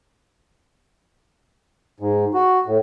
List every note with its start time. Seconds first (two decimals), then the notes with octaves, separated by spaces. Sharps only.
2.00 G#2
2.34 F#4
2.66 A2